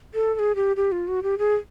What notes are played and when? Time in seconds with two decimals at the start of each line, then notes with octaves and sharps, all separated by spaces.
0.14 A4
0.35 A4
0.39 G#4
0.55 G4
0.76 G4
0.92 F4
1.08 F#4
1.23 G4
1.38 G#4